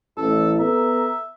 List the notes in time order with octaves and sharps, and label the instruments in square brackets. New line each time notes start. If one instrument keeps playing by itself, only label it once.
[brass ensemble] A1 [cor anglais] A4
[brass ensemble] B3 A4 A#5 [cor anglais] E5